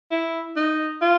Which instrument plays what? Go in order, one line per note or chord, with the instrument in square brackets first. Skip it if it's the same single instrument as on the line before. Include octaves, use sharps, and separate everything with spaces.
[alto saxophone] E4
D#4
F4